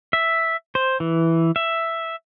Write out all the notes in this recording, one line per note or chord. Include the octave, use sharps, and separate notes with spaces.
E5
C5
E3
E5